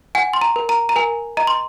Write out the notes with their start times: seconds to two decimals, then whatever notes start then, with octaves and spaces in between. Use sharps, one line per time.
0.15 F#5 G#5
0.33 C6
0.41 A#5
0.56 A#4
0.69 A#5
0.89 A#5
0.96 A#4 G#5
1.37 D#5 A#5
1.47 C6